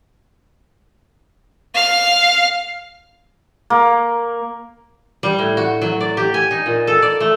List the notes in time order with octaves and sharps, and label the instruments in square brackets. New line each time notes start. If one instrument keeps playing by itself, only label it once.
[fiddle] F5
[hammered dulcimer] A#3
[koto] G3
A2
F#4
F#3
D5
G4
G#5
D#4
A#2
A4
D5
A3